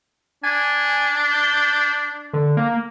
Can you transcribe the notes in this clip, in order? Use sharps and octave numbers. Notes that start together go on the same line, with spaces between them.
D4 G#5
G6
D3
A#3